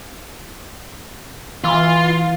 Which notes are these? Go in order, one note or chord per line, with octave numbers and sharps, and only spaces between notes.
E3 F4